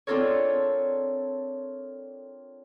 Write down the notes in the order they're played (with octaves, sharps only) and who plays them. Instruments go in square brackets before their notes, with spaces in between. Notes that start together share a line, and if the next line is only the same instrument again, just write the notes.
[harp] C4 D4 F4 A4 A#4 C#5